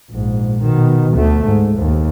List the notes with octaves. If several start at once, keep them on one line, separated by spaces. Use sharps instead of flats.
A#1 G#2
B2 D#3
D2 A3
G#2
D#2